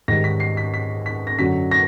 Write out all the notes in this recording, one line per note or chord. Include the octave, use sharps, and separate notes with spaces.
G#2 D#3 G3 A#6
B6
C7
B6
B6
B6
A#6
F#2 D3 F#3 B6
A#6